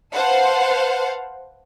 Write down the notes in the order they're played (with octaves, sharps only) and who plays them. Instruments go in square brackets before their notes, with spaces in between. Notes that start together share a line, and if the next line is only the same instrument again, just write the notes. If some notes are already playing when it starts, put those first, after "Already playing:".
[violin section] B4 C5 F5 F#5 A5